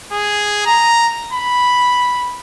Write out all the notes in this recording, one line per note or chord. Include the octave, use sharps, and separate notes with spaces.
G#4
A#5
B5